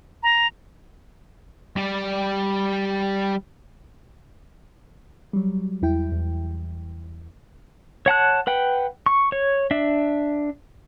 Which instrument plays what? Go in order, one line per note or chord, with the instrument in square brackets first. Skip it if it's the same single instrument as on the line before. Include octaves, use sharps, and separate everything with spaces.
[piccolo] A#5
[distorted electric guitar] G3 D5
[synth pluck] F#3 G3
E2 E4 G5
E2
[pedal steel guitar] C#5 F#5 A5 F#6
B4 F#5 G5
C#6
C#5
D4 E5